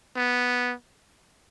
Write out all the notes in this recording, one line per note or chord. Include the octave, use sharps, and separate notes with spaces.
B3